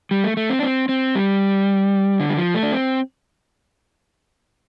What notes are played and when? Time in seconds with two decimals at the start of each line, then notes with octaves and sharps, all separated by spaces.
0.11 G3
0.24 A3
0.37 A3
0.50 C4
0.59 D4
0.63 C4
0.89 C4
1.15 G3
2.20 D3
2.29 G3
2.37 F3
2.55 A3
2.63 D4
2.72 C4